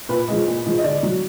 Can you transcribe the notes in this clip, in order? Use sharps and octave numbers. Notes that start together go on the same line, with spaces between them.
A#2 B4
F3 G#3
A#2
F3 G#3
D#5
D3 D5
F#3